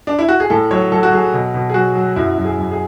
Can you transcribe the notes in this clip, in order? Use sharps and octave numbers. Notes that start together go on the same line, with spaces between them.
D4
E4
F#4
G#4
A2 A4
F#3 C#5
F#3 A4
F#4
F#3 G#4
B2
B2
G#4
F#3 F#4
F#3
F#2 E4
F#2
G#4
F#2
G#4